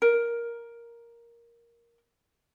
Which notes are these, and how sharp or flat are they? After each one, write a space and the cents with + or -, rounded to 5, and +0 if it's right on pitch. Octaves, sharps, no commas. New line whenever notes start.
A#4 +5